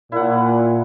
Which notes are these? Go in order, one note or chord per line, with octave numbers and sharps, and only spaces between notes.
A#2 E4 F#5